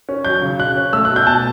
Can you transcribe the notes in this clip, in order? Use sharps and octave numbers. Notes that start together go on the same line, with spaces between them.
C#4
F#3 G6
C#3
C#3 F#6
C#4
A3 E6
B2 F#6
G6
B2 A5